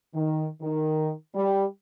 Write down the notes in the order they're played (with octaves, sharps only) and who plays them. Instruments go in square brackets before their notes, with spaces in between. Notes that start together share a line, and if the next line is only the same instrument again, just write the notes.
[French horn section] D#3
D#3
G3